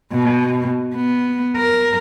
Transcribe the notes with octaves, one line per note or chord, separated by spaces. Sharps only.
B2
B3
A#4